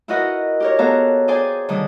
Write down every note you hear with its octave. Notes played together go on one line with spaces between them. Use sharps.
E4 F#4 A#4 B4 D#5 F#5
G4 A#4 C#5
B3 A4 C#5 F5 A#5
G#4 C5 D5 G5 G#5
D3 D#3 G3 D#6